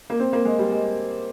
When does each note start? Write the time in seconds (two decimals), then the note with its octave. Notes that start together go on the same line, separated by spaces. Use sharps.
0.10 A#3
0.20 C4
0.33 A#3
0.45 G#3
0.59 G3
0.71 G#3